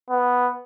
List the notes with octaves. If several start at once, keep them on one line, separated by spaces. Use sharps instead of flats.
B3